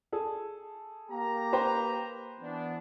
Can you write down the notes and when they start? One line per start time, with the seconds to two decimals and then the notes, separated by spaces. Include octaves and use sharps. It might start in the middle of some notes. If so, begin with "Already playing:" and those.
0.12 G#4 A4
1.10 A#3 G4 A#5
1.53 B4 C5 G5
2.40 E3 B3 D4